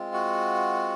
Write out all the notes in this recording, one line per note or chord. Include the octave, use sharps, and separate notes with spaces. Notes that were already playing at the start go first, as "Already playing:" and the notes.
Already playing: G#3 C4 F4
F#4 F#5